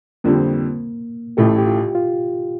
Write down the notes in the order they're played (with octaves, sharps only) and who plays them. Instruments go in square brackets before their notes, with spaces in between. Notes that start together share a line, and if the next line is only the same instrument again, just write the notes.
[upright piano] F2 D3 G3 C4 [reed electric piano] A#3
[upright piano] A1 A2 A3 [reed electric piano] G4
[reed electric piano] G4
F4
F4